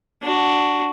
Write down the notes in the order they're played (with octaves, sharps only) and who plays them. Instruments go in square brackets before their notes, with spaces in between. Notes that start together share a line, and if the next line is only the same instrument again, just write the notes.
[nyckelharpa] D4 F#4